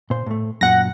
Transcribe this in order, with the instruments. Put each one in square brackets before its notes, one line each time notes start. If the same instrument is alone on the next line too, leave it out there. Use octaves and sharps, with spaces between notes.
[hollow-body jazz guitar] A#2 C5
A2 A3
[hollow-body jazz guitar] F#2 A#2 [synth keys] F#5 A#6